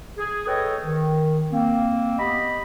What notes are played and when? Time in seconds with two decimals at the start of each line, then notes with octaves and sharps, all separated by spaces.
0.18 G#4
0.47 G#4 A4 B4 C#5 D#5 G5
0.84 D#3
1.51 A#3 C4
2.19 B3 G4 D#5 B5